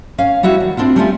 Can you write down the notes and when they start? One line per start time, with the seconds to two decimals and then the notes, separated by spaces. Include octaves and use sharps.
0.18 C#4 F5
0.43 G3 E4 F#4 E5
0.60 D#3
0.77 C4 D4 E4 F4
0.96 G3 A3 C#4 D4 E4 F4